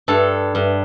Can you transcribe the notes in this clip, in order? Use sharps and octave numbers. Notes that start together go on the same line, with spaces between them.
G2 A4
G2